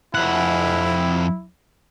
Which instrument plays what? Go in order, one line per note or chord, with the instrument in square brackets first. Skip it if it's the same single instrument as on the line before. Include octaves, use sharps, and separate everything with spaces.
[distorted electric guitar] F2 F#5 [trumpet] E4